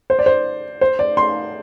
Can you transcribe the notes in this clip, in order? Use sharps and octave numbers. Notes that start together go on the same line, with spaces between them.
C5
D5
C5
C5
D5
C6